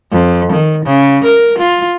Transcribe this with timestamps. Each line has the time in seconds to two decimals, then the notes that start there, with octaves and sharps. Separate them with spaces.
0.12 F2
0.53 D#3
0.85 C#3
1.25 A#4
1.59 F4